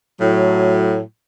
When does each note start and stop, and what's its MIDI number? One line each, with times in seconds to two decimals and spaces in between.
0.21 1.00 45
0.21 1.00 54